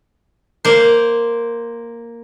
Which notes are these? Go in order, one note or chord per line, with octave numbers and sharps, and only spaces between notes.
A#3 C5